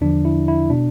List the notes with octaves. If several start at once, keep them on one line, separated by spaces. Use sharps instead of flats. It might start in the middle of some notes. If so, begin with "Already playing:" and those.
E2 D3 F3 D4
E4
E4
B2 D4